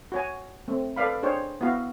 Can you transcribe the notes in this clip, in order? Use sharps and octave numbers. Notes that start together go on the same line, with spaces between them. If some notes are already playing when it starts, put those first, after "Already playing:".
F#4 C#5 G#5
A3 C4
A4 B4 D5 F5 B5
D4 G#4 C5 C#5 G5
B3 E4 F#4 F5